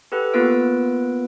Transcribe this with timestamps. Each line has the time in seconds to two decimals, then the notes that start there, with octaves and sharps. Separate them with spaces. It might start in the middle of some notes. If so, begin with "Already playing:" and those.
0.12 G4 A4 B4 F#5
0.34 A#3 B3 F4 B4 E6 D7